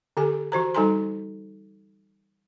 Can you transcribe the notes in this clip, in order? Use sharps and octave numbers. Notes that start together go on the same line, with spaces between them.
D3 G4 A4 G#5
E3 F#4 C5 A#5
G3 D#4 A4 G#5 A#5 C6